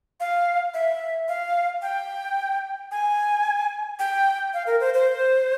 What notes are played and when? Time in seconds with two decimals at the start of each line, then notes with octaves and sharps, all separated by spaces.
0.20 F5
0.74 E5
1.28 F5
1.82 G5
2.91 G#5
3.99 G5
4.54 F5
4.67 A#4
4.80 C5
4.94 C5